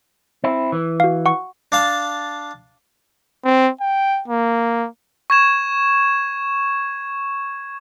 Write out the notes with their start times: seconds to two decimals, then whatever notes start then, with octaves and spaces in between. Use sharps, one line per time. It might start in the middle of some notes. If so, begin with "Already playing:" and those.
0.44 C4 E4
0.72 E3
1.00 F#4 F5
1.26 F#5 C#6
1.72 D4 F5 A5
3.44 C4
3.81 G5
4.28 A#3
5.30 C#6 G#6 E7